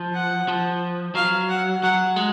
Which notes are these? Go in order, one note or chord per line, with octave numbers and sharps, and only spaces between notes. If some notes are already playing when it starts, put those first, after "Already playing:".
Already playing: F3
F#5
F3
F#3 F5
F#5
F#3 F#5
G#3